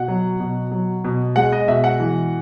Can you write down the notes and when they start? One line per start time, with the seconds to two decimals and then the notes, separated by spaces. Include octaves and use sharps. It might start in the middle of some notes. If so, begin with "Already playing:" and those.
Already playing: B2 F#5
0.08 F#3
0.40 B2
0.72 F#3
1.04 B2
1.36 G#3 F#5
1.52 D#5
1.68 B2 E5
1.84 F#5
2.00 E3